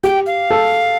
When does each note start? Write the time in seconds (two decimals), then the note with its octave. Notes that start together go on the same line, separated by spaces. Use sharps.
0.03 G4 G5
0.26 F5
0.50 A4